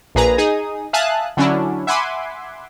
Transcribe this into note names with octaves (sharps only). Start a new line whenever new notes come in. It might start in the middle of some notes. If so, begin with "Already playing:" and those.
A#1 A#2 G#4 B4 A#5
D#4 G#4 D#6
E5 F5 G#5 A5 D#6 F#6
D3 F#3 C#4 D4 E4
E5 F#5 G#5 B5 C6 D6